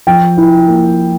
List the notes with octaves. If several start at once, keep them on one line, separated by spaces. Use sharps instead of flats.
F3 G5
E4
A#3